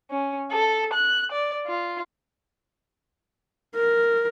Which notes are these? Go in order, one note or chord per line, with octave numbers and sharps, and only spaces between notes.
C#4
A4
F#6
D5
F4
A#4